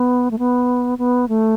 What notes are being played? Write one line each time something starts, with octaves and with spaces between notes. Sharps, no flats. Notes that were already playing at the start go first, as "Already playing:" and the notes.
Already playing: B3
A3
B3
B3
A3